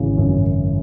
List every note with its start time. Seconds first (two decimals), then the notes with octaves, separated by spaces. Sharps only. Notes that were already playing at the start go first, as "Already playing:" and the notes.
Already playing: G#1 C#3 E3
0.18 F#2